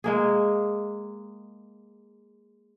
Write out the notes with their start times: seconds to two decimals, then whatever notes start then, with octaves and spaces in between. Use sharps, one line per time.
0.04 G#3 A#3 G#4